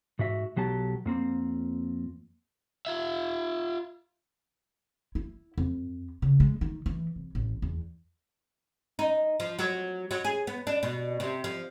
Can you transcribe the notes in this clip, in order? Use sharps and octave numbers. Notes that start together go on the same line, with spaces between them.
G#2 F#4 E5
B1 F#3 G4 A5
F2 A#3 C4
F4 E5
E4
F2
C#3
G#3
D#3
E3
C2
A1
E2
D#4
F3
F#3
F#3
G#4
B3
D4
B2
C3
F3